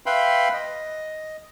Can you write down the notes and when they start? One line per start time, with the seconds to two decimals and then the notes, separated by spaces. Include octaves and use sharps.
0.06 B4 E5 F5 G5 B5 C6
0.53 D#5